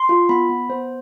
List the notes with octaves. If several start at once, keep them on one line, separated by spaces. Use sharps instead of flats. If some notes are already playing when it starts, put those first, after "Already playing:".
Already playing: C6
F4
B3 B5
B3
B3 C5